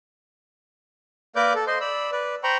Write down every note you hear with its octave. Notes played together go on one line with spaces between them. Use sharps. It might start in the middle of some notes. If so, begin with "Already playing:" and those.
A#3 A#4 B4 D5 D6 G6
A4
C5 D#5 C6
D5 B5 E6
B4 D5
C5 G5 A#5 B5 C#6